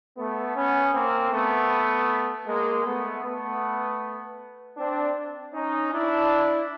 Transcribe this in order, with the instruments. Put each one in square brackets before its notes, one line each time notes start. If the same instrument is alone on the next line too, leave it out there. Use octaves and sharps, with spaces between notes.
[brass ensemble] A3 B3
B3 C#4
A#3 C4
A3 B3
G#3 A#3
A3 B3
A3 B3
C4 D4
C#4 D#4
D4 E4